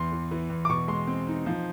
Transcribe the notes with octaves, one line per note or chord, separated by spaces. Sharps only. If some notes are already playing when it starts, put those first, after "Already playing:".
Already playing: E2 C6
E3
E3
E2
D6
B2 C#6
G#3 C6
C4
D#4
F3